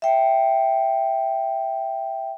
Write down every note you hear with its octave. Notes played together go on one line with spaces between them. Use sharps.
E5 G5